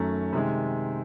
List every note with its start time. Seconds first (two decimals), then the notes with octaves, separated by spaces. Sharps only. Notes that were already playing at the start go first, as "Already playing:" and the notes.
Already playing: F#2 D#3 F#3 A3 C#4
0.33 C3 D#3 G#3